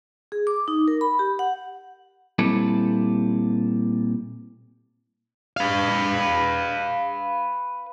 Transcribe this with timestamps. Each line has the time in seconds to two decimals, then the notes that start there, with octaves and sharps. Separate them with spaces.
0.32 G#4
0.47 D6
0.68 D#4
0.88 A#4
1.01 B5
1.19 G4
1.39 F#5
2.39 A#2 G3 C4 E4 A4 B4
5.57 B4 F5